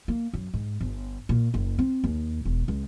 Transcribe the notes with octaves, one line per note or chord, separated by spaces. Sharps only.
A#3
F#2
G#2
G1
A#2
F#1
C4
D#2
E1
C#2